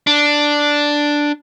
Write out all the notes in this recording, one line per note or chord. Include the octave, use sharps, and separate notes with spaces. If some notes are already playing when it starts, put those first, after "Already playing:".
D4